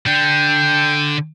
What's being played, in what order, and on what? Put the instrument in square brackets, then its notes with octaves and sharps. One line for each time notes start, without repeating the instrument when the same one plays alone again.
[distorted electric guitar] D3 D4 [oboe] G5